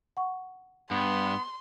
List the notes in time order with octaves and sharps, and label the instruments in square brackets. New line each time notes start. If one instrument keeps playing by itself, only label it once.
[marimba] F#5 C#6
[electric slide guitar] G2 [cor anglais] B3 [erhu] C6